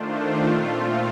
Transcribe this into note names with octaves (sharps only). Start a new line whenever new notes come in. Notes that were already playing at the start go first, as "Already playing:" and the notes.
Already playing: D#3 A3 D4 F4 C5
A#2 A3 C4 F4